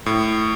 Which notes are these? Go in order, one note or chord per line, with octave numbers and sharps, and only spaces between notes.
A2